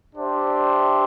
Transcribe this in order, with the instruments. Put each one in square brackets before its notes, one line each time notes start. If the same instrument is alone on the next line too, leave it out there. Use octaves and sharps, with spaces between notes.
[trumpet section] D4 G4 C5 E5